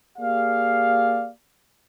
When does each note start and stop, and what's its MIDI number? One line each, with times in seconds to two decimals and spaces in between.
0.18 1.29 58
0.18 1.29 67
0.18 1.29 68
0.18 1.29 74
0.18 1.29 77